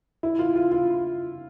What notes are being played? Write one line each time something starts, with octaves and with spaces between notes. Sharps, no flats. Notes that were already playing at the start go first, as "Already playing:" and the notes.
E4
F4
F4
F4